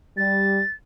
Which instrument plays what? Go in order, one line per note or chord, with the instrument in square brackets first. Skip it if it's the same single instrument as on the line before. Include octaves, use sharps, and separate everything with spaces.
[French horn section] G3 [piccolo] A6